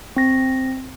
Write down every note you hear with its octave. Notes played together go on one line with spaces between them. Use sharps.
C4 A#6